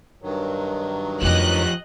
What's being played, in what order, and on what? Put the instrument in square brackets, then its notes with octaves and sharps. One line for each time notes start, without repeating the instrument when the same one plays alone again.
[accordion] G2 D#3 F#3
[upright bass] F2 C4 [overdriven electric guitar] F3 G4 [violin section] D#5 F#6